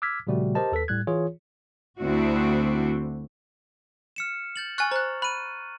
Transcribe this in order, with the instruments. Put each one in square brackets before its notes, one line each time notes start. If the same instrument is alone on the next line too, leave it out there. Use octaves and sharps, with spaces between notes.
[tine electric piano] D6 E6 F6 G#6 B6
A#2 C#3 F3 G3 A3 F#4
G4 A#4 C5 D#5 A5
D#2 A4 B4 B6
A2 G3 F#6 G#6
E3 F4 G#4 C#5
[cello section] D2 C4 D4 E4 F#4
[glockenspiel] F6 C#7 E7
G6 A6 F#7
[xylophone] G#5 F#6 [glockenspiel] C#6 F6 A6
[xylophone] C5 F#6 [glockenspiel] A#5
[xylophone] B5 [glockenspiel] F#6 D#7